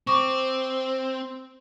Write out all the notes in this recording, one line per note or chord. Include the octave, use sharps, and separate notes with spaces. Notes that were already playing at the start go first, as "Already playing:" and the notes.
C4 C#6 D6